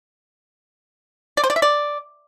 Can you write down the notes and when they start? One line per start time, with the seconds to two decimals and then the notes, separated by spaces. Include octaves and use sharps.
1.37 D5
1.44 C5
1.50 D5
1.56 E5
1.62 D5